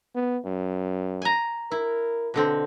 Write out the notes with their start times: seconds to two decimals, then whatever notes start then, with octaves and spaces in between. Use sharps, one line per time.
0.15 B3
0.45 F#2
1.22 G#5 A#5
1.71 E4 A#4
2.34 B2 D3 C4